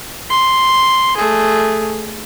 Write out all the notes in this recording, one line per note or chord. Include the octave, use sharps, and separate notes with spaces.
C6
A3 G#4